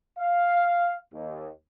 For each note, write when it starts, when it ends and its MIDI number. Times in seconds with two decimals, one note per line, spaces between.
0.19 0.95 77
1.13 1.50 39